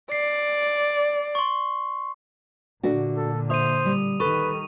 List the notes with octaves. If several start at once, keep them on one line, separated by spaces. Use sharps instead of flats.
D5 C7
C6 C#6
A#2 D3 A3 D4 F#4
A4
C5 E5 D#6 D#7
G3
D#3 G3 A4 B4 C#6